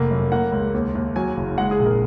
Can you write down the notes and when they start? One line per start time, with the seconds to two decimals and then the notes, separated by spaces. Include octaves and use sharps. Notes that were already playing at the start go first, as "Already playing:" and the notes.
Already playing: F1 A#3
0.11 F#2
0.32 A#3 F#5
0.52 C#2
0.74 D#2
0.95 D#2
1.16 F#3 G#5
1.36 F#1
1.58 G#3 F#5
1.71 G#4
1.79 A#1
1.85 A#4